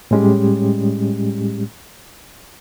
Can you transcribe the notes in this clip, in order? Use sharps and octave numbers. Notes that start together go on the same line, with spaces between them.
A2 G3 G#3 C#4 G4